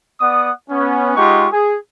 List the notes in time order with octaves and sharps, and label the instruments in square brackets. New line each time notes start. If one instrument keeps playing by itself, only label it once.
[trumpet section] B3 D5 F#5 D#6
B3 C#4
G#3 D#4 F4 G4 F#5 C#6
G#4